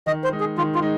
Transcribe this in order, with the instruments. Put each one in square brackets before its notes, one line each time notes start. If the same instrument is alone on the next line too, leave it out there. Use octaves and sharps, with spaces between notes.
[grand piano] D#3 [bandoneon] D#5
[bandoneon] C5
[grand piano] G#3 D#4
[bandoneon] G#4
[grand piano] D#3 [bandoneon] F4
[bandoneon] F4
[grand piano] G#3 D#4